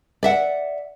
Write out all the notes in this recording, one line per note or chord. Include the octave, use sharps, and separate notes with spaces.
D5 E5 F#5